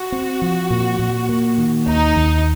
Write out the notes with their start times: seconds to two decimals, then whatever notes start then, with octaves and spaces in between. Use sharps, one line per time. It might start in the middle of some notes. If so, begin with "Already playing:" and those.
Already playing: F#4
0.12 C4
0.42 F3
0.70 A#2
0.99 A#2
1.29 A#3
1.58 D#3
1.87 D#2 D#4
2.16 D#2